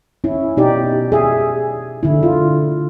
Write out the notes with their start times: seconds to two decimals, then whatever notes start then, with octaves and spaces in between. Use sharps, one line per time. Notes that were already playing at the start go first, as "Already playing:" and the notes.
0.24 C#4 E4
0.57 B2 D#4 G4 D5
1.12 G#4 E5
2.03 D3 E4
2.23 F4